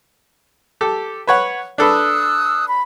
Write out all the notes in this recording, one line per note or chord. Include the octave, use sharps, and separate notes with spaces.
G4 A4
B4 C#5 F#5
D4 A4 B4 D#6 E6 F#6
B5